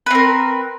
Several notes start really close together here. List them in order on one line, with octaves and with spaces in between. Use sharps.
B4 C4 A#4